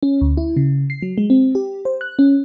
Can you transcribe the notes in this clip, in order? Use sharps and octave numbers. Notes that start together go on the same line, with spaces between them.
C#4
D2
E4
C#3
C7
F#3
G#3
C4
G4
C5
F#6
C#4